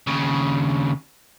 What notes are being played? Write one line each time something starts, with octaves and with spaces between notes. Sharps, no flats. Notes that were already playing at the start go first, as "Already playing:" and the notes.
D#2 C#3